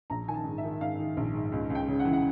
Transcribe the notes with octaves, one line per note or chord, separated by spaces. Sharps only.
A#1 A#5
D#3 G#5
A5
G#2
E5
D#3
G#2 F5
D#3
A#1
G#2
C#2
C#2
G5
C#3
F#5
E3
F#5